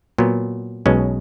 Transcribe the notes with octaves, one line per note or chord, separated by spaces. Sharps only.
A#2 F#3 B3
B1 B2 G#3 C#4